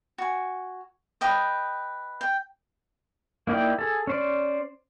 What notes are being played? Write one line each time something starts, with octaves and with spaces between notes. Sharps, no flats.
F#4 G#5
B4 D#5 G5 D#6
G5
A#3 D#4 E4 D5 G5
G#4 A4
C#4 C5 D5